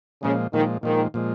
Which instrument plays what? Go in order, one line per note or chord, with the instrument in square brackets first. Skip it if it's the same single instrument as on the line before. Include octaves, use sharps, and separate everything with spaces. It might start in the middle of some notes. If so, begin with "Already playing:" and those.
[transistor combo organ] A#2 F3 G#3 [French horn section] C#3
[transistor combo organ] A#2 F3 G#3 [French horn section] D#3
[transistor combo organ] A#2 F3 G#3 [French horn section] D#3
[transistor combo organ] A#2 F3 G#3